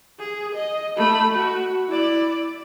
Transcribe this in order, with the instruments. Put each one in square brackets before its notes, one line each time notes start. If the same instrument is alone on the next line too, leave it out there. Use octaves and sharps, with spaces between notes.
[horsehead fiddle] G#4
D#5
A3 B5
F#4
E4 D5